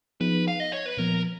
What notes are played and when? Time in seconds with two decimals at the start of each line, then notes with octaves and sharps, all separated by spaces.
0.20 F3 B3 D#4 G#4 B4
0.48 F5
0.60 D#5
0.73 C#5
0.86 B4
0.97 A#2 F3 B3 A#4